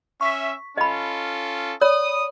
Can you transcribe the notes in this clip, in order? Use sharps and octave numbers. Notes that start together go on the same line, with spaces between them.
C#4 E5 C#6 B6
C#4 F4 A4 D#5 B5
C#5 D5 B5 D#6